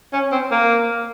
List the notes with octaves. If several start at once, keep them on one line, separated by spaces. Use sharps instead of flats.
C#4
C4
A#3